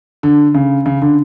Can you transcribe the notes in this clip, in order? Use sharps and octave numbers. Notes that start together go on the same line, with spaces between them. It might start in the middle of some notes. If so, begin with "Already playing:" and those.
D3
C#3
C#3
D3